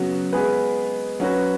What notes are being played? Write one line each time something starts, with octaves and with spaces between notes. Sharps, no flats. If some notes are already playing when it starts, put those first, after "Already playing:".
Already playing: C#3 F#3 B3 F#4
G#3 B3 G#4 B4
F#3 C#4 F#4 B4